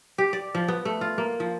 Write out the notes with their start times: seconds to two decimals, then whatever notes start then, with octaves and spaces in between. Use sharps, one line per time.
0.18 G4
0.33 D5
0.55 F3
0.68 B3
0.85 A3
1.01 F4
1.18 A#3
1.40 F3